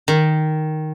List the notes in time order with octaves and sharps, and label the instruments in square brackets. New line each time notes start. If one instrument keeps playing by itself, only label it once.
[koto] D#3